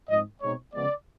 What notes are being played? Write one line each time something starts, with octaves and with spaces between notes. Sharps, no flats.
G#2 F3 G#3 C4 D#5
B2 G#3 C4 D#4 C#5
C#3 F3 G#3 B3 D5